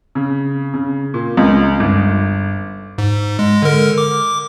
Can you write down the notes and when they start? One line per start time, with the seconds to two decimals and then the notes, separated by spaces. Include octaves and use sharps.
0.15 C#3
0.74 C#3
1.14 A#2
1.37 C#2
1.80 G1
2.98 G#2
3.39 G#3
3.62 D3 A#4
3.98 D6